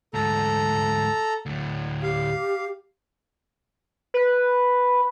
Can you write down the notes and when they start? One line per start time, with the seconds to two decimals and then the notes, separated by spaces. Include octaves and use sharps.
0.14 D2 G#2 A4 A#5
1.46 D2 A2
2.03 G4 F5
4.14 B4